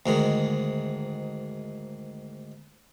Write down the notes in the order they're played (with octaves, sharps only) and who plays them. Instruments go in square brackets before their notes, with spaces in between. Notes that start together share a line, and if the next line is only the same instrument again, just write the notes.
[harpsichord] D2 G#2 D#3